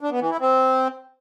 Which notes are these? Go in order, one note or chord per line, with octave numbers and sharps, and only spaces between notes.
D4
B3
E3
E4
C4